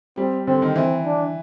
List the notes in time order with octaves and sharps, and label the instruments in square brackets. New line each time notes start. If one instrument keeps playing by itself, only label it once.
[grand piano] G3 [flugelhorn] C4
[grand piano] D3 [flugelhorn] C4
[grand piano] D#3
[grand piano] E3 [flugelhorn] C4
[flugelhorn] D4